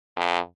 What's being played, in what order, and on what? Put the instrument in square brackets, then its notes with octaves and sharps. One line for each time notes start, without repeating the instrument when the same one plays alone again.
[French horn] F2